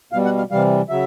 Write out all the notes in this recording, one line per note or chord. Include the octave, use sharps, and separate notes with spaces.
B2 G3 F5
F#5
F5
C3 E3 G3 F5
C#3 F#3 E5